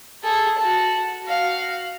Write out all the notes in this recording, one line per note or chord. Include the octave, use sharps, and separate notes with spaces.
G#4 A4
F#4 A5
F#4 F5